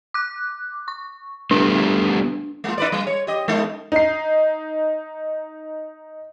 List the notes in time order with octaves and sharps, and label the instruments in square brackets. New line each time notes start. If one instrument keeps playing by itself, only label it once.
[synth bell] D6 F#6
C#6
[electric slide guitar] G3 A3 B3 [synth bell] D4
[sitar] G#3 A#3 F4
D#4 B4 D5
G3
C#5
G4 D#5
G#3 D#4
[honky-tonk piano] D#4 C7